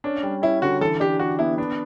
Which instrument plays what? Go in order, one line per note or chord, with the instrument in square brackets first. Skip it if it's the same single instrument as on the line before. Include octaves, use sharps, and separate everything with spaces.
[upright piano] C#4 [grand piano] D4
[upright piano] G3
[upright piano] C#4 [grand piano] E4
[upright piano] D3 [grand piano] F#4
[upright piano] E3 [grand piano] A4
[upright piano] D4 [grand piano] G4
[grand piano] F#4 [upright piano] G4
[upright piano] B3 [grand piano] E4
[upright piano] B3 [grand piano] D4